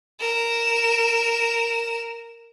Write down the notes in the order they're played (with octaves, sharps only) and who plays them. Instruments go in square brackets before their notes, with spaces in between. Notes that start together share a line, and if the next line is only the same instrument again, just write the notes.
[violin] A#4 E7